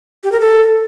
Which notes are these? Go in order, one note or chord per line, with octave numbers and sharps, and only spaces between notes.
G4
A#4
A4